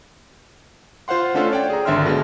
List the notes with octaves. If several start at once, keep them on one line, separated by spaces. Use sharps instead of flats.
F4 C5 F5 F#5 C6
A3 C#4 D4 F4 A4 C5
C#5 D5 G5
G#4 A#5
G#1 D3 E5 A#5 C6 F6
B2 D3 G#3